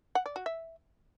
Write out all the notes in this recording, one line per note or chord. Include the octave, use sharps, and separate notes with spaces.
F#5
D5
F#4
E5